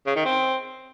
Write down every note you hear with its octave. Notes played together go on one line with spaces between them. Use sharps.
C#3
D#3
C4